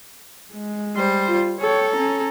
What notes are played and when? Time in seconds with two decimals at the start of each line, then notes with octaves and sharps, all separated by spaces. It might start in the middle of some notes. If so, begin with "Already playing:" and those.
0.53 G#3
0.96 G3 C5
1.27 F4
1.60 A4 C#5 G5
1.94 C#4 A#5